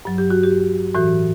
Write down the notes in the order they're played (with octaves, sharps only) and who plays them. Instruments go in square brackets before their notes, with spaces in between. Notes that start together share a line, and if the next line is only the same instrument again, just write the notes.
[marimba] G2 F#3
G4
F#4
G4
A2 E3 F#4